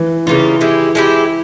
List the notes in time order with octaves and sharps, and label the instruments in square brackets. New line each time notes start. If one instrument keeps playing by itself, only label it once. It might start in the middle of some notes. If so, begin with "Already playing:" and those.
Already playing: [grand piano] E3
[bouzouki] C#3 G3 A#3 F4 [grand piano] E3
[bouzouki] G#3 E4 G4
G#3 E4 G4